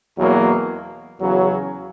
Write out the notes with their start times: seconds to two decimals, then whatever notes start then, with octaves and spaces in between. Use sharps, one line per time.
0.17 E2 B2 F#3 A#3
1.19 E2 C#3 F#3